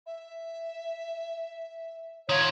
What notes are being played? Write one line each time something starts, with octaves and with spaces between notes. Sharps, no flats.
E5
D#3 F4 C#5